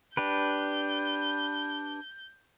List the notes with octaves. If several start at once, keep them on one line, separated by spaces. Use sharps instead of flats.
D4 G4 B4 G6